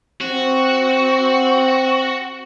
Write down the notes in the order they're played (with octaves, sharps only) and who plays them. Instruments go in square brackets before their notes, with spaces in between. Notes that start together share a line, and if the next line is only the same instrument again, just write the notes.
[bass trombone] C4 [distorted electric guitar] F#4